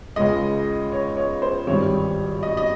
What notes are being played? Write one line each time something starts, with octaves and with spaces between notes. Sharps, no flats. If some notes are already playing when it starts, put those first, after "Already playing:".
C#2 C#3 G#3 D#5
C#5
C#5
C5
G#1 G2 G3 C#5
D#5
D#5